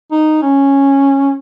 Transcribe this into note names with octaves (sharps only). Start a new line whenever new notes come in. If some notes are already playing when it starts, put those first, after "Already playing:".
D#4
C#4